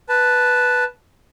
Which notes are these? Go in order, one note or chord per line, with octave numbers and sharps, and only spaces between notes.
B4 A5